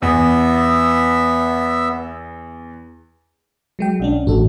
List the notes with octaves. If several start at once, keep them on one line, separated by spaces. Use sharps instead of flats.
E2 B3 E5 E6
F#3 G#3 G5
B1 C#4 D4
A1 F#4 A4